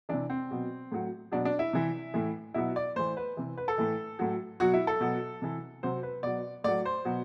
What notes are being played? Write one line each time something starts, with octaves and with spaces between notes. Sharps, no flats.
C3 E3 D4
C4
B2 F#3
A2 F#3
B2 F#3 D4
D4
E4
C3 E3
A2 E3
B2 F#3 E4
D5
A2 E3 C5
B4
C3 E3
B4
A4
A2 E3
A2 F#3
B2 F#3 F#4
E4
A4
B2 F#3
C3 E3
C3 F#3 C5
B4
B2 F#3 D5
A2 F#3 D5
C5
B2 F#3